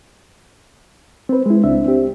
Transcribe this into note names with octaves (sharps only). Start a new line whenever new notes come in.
C4 B4
G#3 E4
C#2 C4 D4 E5
C4 G4